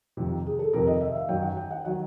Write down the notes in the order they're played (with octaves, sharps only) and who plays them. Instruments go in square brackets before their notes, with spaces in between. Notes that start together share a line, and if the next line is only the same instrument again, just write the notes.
[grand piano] F2 C3 D#3
[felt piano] G#4
A4
[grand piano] F2 C3 D#3 [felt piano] A#4
[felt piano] D#5
E5
F5
[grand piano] F#2 D#3 F#3 [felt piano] G5
[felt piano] F#5
G5
F#5
[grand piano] D#3 F#3 [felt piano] F#5